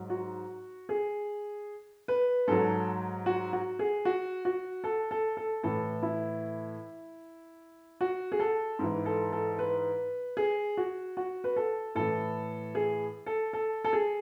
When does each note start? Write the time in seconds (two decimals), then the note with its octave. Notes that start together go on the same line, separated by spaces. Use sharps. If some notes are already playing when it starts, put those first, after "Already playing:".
Already playing: G#2 F#3
0.10 F#4
0.89 G#4
2.08 B4
2.47 G#2 F#3 A4
3.26 F#4
3.53 F#4
3.79 G#4
4.05 F#4
4.45 F#4
4.84 A4
5.11 A4
5.37 A4
5.63 A2 E3 A4
6.03 E4
8.01 F#4
8.32 G#4
8.40 A4
8.79 G#2 E3
9.06 A4
9.32 A4
9.59 B4
10.37 G#4
10.77 F#4
11.17 F#4
11.44 B4
11.56 A4
11.95 A2 E3 A4
12.75 G#4
13.26 A4
13.53 A4
13.84 A4
13.93 G#4